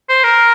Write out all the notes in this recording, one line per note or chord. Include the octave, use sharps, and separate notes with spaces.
C5
A#4